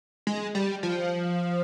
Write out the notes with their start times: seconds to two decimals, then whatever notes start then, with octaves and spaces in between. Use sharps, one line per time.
0.27 G#3
0.55 G3
0.83 F3